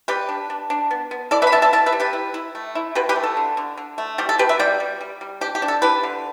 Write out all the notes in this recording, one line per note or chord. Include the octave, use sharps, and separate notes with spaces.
G3 G4 B4
D4
D4
D4
B3
B3
E4 A4 D5
B4 E5
B5
B3 E5 A5
E5 A5
E4 E5 A5
B4 E5
G3
G4 B4
E4
E4
A3
E4
B2 G4 B4
G4 B4
A3
A4
D3
D3
D3
A3
G3 G4
A4
B2 G4 B4
B4 E5
G3 D5 G5
G3
G3
G3
D4 G4
G4
D4
A4
E4 G4 B4
D3